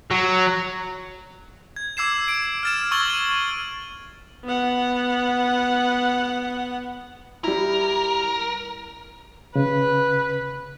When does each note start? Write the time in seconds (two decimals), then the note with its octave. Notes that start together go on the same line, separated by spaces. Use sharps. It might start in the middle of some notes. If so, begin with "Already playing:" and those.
0.11 F#3
1.76 G#6
1.97 D6 E6 G#6 C7 E7
2.28 D7
2.63 F6 A6 E7
2.91 C#6 E6 G#6 A6 F#7 G7
3.10 D#7
4.44 B3 F#5
7.44 G3 E4 A#4
9.56 C#3 B4